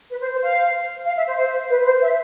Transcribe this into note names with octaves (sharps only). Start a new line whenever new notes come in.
B4
C5
C5
F5
F5
E5
C5
C5
B4
C5
E5